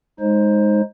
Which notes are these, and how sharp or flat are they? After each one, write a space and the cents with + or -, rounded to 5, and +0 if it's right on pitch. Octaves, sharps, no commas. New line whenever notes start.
G#3 +0 D#4 +5 C5 +15